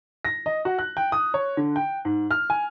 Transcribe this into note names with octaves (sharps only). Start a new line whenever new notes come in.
A#6
D#5
F#4
F#6
G5
D#6
C#5
D3
G5
G#2
F6
G#5